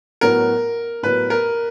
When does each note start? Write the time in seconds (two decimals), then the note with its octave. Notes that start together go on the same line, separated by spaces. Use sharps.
0.21 A2 F#3 B3 A#4
1.03 A2 F#3 B3 B4
1.30 A#4